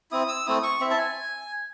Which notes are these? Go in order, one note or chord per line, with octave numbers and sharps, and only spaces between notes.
C4 E4 D#6
E6
A3 C4 E4 D#6
C#6
C4 E4 E5
A5
G#5